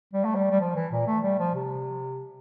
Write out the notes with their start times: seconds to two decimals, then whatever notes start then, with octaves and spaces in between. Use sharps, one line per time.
0.13 G3
0.24 A3
0.35 G3
0.51 G3
0.60 F3
0.76 E3
0.92 A#2
1.07 A3
1.23 G3
1.39 F3
1.55 C3